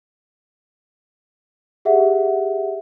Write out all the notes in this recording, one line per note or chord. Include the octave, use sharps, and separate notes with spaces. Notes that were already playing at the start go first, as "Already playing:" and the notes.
G4 G#4 E5 F#5